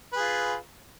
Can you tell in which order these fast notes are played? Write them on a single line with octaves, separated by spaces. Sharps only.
B4 G#4 F4